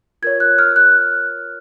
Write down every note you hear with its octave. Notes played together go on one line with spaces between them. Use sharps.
F4 A#4 C#5 G#6
F#6
F6
F#6